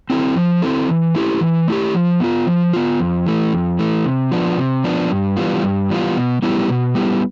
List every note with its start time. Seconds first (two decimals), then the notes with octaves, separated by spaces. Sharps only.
0.10 C4 E4 A4
0.36 F3
0.62 C4 E4 A4
0.88 E3
1.15 A3 E4 G4
1.41 E3
1.68 A3 E4 G4
1.94 F3
2.20 B3 F4
2.47 F3
2.73 B3 F4
3.00 F2
3.26 E3 A3
3.53 F2
3.79 E3 A3
4.05 C3
4.32 F3 B3 D4
4.58 C3
4.84 F3 B3 D4
5.11 G2
5.37 E3 G3 B3 F4
5.63 G2
5.90 E3 G3 B3 F4
6.17 B2
6.42 G3 B3 E4 G4
6.69 B2
6.95 G3 B3 E4 G4